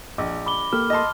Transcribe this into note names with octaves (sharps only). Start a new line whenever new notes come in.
A#1 D#5 D6
B5 D6 G7
A#3 G4 A4 F6
D#5 A5 C6